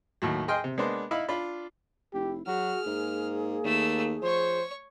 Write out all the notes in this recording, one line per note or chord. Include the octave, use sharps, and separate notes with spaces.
D#2 A2 F#3
G#4 D#5 G5 C6 F6
C3
G#3 A#3 B3 D4 C5
D#4 E4 E5 F5 B5
D4 F4 B5
F1 E4 G4
F#3 F#4 G#4 F6
G#2 A#3
D#2 A3 E6
F3 C5 C#5 C#6